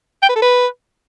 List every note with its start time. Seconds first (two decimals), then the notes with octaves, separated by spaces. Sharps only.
0.23 G5
0.29 B4
0.36 A4
0.42 B4